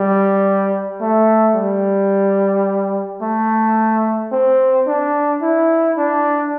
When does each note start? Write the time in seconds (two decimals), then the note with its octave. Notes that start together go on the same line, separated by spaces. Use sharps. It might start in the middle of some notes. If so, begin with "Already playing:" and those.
Already playing: G3
1.01 A3
1.56 G3
3.22 A3
4.32 C4
4.87 D4
5.42 E4
5.97 D4